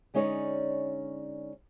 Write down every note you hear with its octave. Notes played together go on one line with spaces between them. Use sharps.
D3 G#3 C#4 D#4 C#5 D5